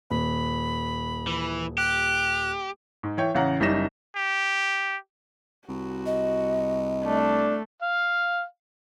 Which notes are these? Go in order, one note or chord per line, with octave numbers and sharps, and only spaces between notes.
D#1 B5
E3
G4 F#6
G#2
E3 C#5 G5
A1 C#3 F5 F#5 A#5
F#1 G3 C#4 D#4 A#6 E7
G4
C2 F#4
D#5
A3 D4
F5